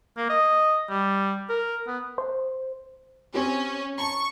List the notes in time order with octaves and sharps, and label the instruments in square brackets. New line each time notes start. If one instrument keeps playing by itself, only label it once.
[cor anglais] A#3
D#5
G3
A#4
B3
[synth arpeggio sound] C5
[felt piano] C4 G4 [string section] C#4
[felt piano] A5 A#5 [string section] C#6